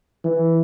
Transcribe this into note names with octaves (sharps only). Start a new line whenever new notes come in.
E3